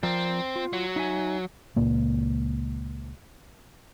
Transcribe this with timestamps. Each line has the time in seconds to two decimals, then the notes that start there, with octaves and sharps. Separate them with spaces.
0.03 F3 C4 A#4 D5
0.56 F4
0.73 F#3
0.96 D#4 E5 G#5
1.76 C#2 A#2 A#3